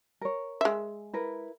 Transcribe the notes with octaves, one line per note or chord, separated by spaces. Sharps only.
A#4 C#5
G#3 E5
E4 A#4 B4